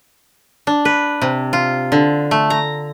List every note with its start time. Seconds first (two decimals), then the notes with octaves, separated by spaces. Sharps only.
0.67 D4
0.85 B4
1.22 C3
1.53 F4
1.92 D3
2.31 A3
2.50 A#5